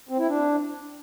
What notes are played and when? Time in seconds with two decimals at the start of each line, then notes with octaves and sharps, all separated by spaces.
0.09 C4
0.19 E4
0.28 D4